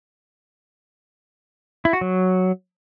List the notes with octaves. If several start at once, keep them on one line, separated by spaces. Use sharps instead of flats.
E4
F#4
F#3